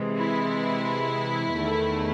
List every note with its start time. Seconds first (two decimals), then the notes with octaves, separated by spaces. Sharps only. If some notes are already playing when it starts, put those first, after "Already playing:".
Already playing: C3 E3 G#3
0.17 E4
1.53 E2 D#3 A3